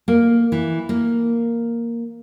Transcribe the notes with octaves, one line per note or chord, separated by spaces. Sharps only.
A#3
E3
A#3